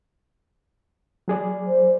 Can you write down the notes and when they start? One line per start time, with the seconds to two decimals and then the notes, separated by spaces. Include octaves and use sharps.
1.28 F#3 G#4 D5
1.66 C5